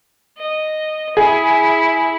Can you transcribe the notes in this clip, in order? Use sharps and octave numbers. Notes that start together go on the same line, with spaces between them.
D#5
E4 G#4